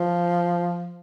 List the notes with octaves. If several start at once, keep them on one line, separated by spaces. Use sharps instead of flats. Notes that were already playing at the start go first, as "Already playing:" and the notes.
Already playing: F3